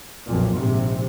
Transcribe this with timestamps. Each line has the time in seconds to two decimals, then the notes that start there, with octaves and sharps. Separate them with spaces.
0.27 B1 F2 A#2
0.57 A#1 G#2 C3